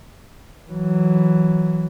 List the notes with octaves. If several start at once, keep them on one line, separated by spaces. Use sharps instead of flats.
E3 F#3